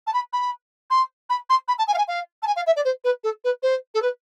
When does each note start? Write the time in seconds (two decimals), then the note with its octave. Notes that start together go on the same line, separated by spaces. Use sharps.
0.07 A5
0.14 B5
0.33 B5
0.90 C6
1.30 B5
1.50 C6
1.68 B5
1.79 A5
1.88 G#5
1.94 F5
1.98 G#5
2.08 F5
2.43 A5
2.47 G#5
2.56 F5
2.67 E5
2.76 D5
2.85 C5
3.04 B4
3.24 A4
3.44 B4
3.63 C5
3.94 A4
4.02 B4